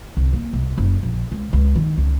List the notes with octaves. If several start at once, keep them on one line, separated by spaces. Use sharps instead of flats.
C2
A#3
C2
F#1
A#1
C#2
C#2
D#3
C#2